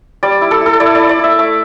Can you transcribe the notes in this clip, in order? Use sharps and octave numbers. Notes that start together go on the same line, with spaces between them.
G3 D5
E4
A4
E4 A4
E4 D5
E4 D5
D5
E4 E5
A3 E5